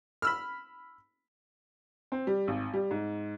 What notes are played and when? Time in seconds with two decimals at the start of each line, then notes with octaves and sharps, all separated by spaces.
0.22 B5 E6 F6
2.12 C4
2.27 G3
2.47 G#1
2.74 G3
2.91 G#2